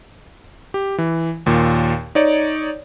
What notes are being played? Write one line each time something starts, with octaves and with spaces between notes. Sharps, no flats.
G4
E3
D#2 A#2
D#4 C#5 D5